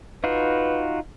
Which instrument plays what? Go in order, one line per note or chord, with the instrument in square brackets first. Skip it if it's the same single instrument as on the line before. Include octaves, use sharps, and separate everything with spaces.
[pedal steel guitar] D#4 F4 F#4 [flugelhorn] B4